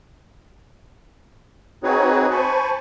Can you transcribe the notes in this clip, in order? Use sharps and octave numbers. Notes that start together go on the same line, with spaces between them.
C4 D#4 F#4 G#4 B4 C#5
C5 G#5 A5 B5 C#6